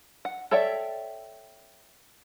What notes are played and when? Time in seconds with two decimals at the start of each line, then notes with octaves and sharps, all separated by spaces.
0.25 F#5
0.51 A4 C#5 D5 E5 G5